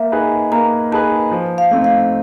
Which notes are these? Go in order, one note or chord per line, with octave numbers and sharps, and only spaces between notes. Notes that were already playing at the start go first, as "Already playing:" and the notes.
Already playing: A#3 E5
D#4 G#4 B4
A#3 A#5
D#4 G#4 B4 A5
F3
F5
A3 C4 D#4
F5